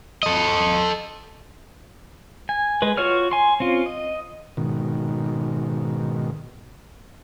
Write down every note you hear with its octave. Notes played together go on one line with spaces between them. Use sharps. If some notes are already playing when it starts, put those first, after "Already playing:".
A4 D#5
G#5
G#3 B4
F4 F#4 C#5 F6
G#5 C6
C4 C#4 F4
D#5
G#2 B2 D#3